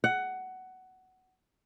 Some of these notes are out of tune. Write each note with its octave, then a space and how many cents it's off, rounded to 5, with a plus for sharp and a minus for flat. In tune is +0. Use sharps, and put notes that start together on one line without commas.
F#5 +15